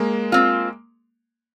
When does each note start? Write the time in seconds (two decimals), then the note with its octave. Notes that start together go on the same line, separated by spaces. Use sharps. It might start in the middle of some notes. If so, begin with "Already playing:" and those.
Already playing: G#3 A#3
0.32 C4 F4